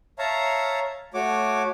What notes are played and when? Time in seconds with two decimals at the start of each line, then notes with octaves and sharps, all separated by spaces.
0.19 C#5 E5 F5 A5 A#5
1.14 A3 F#4 C#5 D6